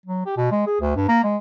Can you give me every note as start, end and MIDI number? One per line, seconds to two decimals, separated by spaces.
0.06 0.25 54
0.26 0.36 67
0.37 0.49 47
0.52 0.66 56
0.67 0.76 68
0.81 0.92 38
0.96 1.04 43
1.09 1.20 58
1.24 1.37 56